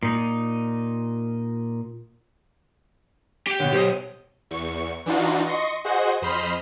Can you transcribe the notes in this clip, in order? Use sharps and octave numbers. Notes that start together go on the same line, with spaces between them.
A#2 D#4
G4 G5
B2 D3 C#5
B1 G4 C5 D#5
E2 C#6
E3 D4 D#4 F4 F#4
D#5 C6 C#6 A#6 C#7
F#4 G#4 C5 D#5 F#5
F2 C5 D#5 B5 C6 F6